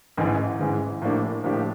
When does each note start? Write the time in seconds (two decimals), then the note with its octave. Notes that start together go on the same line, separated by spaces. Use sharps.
0.17 A1 G#2 E3 G#3
0.59 A1 G#2 E3 G#3
1.02 A2 F3 A#3 D4 G4
1.44 A2 F3 A#3 D4 G4